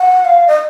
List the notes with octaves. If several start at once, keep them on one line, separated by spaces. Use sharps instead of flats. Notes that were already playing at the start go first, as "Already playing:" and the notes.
Already playing: F#5
F5
D#5